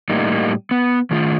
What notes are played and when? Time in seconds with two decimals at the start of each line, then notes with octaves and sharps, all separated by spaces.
0.09 A2 G3 A#3 D#4
0.71 B3
1.11 D#3 A3 F4